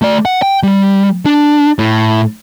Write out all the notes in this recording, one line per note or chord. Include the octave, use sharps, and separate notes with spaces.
A3 D5
F#5
G5
G3
D4
A2